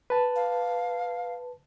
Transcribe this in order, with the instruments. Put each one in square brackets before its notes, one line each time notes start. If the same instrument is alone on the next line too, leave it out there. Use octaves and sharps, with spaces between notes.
[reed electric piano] B4 A5
[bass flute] F5